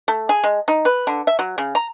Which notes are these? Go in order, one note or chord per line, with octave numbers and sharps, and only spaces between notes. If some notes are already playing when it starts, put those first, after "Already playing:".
A3
G#4
G#3
D#4
B4
D3
E5
F#3
C#3
A#5